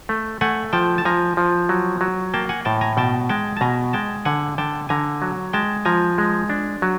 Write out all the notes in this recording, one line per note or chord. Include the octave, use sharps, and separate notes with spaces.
A3
A3 F#5 G#5
F3 G5 A5
A5
F3 G#5 A#5
F3
F#3
F#3
A#3 G5 A5
F#5 G#5
A2 G5 A5
G#5 A#5
B2 G5 A5
G#3 G5 A5
A5
B2 G#5 A#5
G#3 G5 A5
D3 F#5 G#5
D3 G5 A5
D3 G#5 A#5
F#3
G#3 G5 A5
F3 G#5 A#5
G#3
D4
F#3